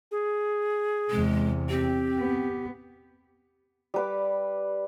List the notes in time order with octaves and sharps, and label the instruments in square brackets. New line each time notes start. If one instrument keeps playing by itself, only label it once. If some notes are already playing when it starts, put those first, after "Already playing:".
[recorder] G#4
[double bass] E2 C3 [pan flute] G#3
[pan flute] C4 [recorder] G4
[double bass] B3
[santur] G3 B4 D6